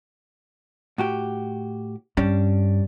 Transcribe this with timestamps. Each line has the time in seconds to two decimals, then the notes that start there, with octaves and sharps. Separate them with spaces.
0.98 A2 F#4 G4
2.17 G2 G3 C#4 D4